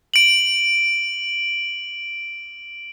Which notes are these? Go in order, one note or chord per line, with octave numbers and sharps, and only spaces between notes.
D7 F#7